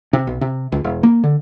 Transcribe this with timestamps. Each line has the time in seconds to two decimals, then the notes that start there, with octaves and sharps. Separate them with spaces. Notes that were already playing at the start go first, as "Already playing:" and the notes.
0.13 C3
0.27 B1
0.41 C3
0.72 C#2
0.84 E1
1.03 A#3
1.24 D3